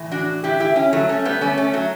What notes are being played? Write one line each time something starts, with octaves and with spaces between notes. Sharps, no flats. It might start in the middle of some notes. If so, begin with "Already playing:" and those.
Already playing: A2 E3
D4 F#4
E4 G4
E4 G4
C#4 E4
F#3 A3
A3 C#4
G3 B3
A3 C#4
A3 C#4
F#3 A3